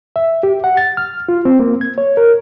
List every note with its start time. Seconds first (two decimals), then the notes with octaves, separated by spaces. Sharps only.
0.16 E5
0.43 G4
0.64 F#5
0.77 A6
0.97 F6
1.29 F4
1.45 C4
1.60 A#3
1.81 G#6
1.98 C#5
2.17 A#4